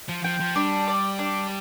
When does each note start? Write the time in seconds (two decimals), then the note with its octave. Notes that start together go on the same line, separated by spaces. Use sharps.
0.09 F3
0.24 F3 G5
0.40 F3
0.56 G3 D4
0.88 D5
1.19 D4